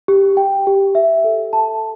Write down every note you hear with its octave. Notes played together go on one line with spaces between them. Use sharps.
G4
G5
G4
E5
A4
A5